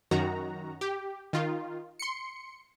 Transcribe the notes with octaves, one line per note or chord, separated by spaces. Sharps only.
F#2 D#3 F#4 A#5
G4
D#3 F4
C6 C#7